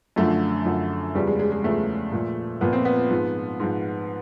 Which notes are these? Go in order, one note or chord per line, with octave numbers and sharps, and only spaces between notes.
F#2 D3 F3 A3
F#2 D3 F3
E2 C#3 F3 G3
G#3
G#3
G#3
E2 C#3 F3 A3
A#2 F3
A#2 F3 B3
C4
B3
G#2 F3
G#2 F3